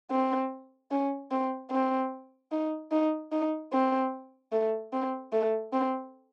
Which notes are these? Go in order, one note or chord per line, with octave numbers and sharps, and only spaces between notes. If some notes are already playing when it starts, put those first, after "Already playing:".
C4
C#4
C4
C4
D#4
D#4
D#4
C4
A3
C4
A3
C4